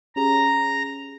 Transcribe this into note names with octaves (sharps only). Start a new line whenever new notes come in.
C#4 G4 G#4 A#5